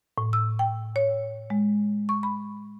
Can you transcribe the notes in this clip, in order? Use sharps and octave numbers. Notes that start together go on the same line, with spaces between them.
A2
E6
G5
C#5
G#3
C#6
B5